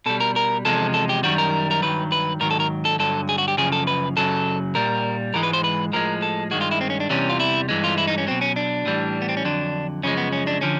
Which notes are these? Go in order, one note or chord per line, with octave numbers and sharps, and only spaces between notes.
B2 G3 A4
A#4
A#4
E2 C3 F3 G#3 A4
A4
G4
F#2 D#3 G3 F#4
A#4
A#4
G2 D#3 F#3 B4
B4
G#2 D#3 F#3 A#4
A4
A#4
A4
G2 D3 F#3 A4
G#4
F#4
G4
F#2 C#3 F3 G#4
A4
B4
F#2 C#3 F#3 A4
A#2 G3 A#4
G#2 E3 G#3 A#4
B4
C5
B4
A2 F3 G#3 A#4
A4
G2 D#3 G#3 F#4
F4
E4
C4
C#4
D4
E2 C3 E3 G3 C#4
F4
E4
G2 E3 G#3
F4
E4
D#4
C#4
B2 F#3 C4
C#4
D4
A2 E3 G3
B3
C4
C#4
F2 D3 F#3 D4
F#2 C#3 F3 G#3 C#4
B3
C#4
D4
D3 F3 C#4